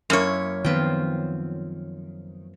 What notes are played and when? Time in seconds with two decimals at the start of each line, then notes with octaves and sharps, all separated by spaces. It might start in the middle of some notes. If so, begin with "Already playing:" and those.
0.10 F#2 A#3 E4 C#5
0.65 D#3 F3 B3 C4 F4 G5